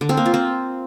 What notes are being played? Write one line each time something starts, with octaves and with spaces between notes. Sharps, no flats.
D3
C4
A#3
F4
C4